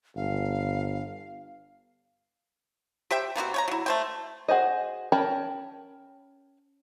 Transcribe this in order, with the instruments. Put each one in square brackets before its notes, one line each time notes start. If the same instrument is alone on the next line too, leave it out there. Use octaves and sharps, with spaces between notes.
[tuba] G1 [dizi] F5
[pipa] G4 C5 E5 G5
B2 A#3 C4 F#4
C#5 G5 A#5
F#3 E4
A3 C5 G5
[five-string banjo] F#4 G#4 C5 D#5
C#4 A#4 G5 A5 B5